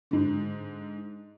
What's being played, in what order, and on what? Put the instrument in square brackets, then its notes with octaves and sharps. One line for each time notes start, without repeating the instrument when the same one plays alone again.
[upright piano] G#2 D3